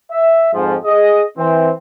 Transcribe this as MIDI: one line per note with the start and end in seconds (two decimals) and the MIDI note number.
0.10 0.49 76
0.54 0.75 41
0.54 0.75 44
0.54 0.75 53
0.85 1.22 68
0.85 1.22 75
1.38 1.71 52
1.38 1.71 60